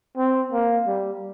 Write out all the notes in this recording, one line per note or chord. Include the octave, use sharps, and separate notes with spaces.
C4
A#3
G3